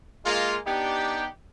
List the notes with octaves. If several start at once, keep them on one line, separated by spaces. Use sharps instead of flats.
G#3 A#3 F4
B3 D4 D#4 G4